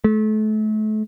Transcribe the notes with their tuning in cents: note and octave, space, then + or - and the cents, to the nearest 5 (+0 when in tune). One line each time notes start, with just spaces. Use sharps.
A3 -35